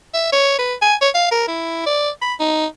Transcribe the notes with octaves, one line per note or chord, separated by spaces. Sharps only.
E5
C#5
B4
G#5
C#5
F5
A#4
E4
D5
B5
D#4